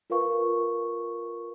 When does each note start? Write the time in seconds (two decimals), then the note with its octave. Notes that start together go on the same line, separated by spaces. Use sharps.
0.10 F4 A#4 B4 F5 C#6